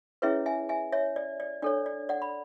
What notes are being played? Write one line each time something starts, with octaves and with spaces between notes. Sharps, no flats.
C#4 E4 G#4 B4 C#5 E5
E5 G#5
E5 G#5
C#5 E5
D5
D5
D4 A4 C#5 D5
D5
D5 F#5
B5